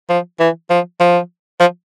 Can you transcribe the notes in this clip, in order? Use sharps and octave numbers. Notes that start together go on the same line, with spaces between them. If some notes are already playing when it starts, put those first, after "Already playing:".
F3
E3
F3
F3
F3